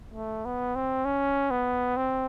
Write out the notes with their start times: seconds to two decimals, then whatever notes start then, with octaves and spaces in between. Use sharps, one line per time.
0.14 A3
0.45 B3
0.75 C4
1.05 C#4
1.51 B3
1.97 C4